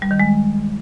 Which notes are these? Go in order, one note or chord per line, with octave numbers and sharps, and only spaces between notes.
G3
D#3
G#3